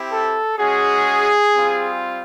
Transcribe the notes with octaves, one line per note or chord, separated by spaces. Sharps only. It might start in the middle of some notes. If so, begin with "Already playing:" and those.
Already playing: C4 E4 G4
A4
G#3 C#4 F#4 G#4
G3 C4 F4